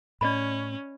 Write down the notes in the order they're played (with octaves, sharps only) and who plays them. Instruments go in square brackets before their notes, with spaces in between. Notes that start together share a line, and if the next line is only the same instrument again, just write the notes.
[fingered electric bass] A2 [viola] C#4 [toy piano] D5 D#5 B5